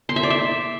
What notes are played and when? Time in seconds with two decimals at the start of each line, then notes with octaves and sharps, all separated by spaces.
0.09 C6
0.16 E5
0.23 D5
0.30 E5